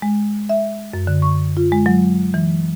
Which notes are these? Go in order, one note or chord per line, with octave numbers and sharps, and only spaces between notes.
G#3
E5
F#2
D3
C#6
F4
G#3
F#3
E3